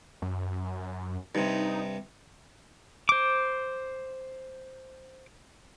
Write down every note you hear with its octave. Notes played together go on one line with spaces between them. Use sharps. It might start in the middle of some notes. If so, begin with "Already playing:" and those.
F#2
G2 C3 D#4
C5 D6